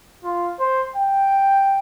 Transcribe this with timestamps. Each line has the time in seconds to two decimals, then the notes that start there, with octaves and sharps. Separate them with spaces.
0.24 F4
0.60 C5
0.96 G5